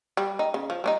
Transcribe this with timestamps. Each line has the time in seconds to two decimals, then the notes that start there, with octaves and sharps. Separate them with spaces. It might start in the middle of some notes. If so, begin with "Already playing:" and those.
0.17 G3
0.39 D#4
0.54 C#3
0.70 F3
0.84 G3 D4 D#4